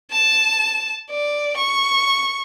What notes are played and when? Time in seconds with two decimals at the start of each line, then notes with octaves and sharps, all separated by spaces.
0.11 A5
1.11 D5
1.57 C#6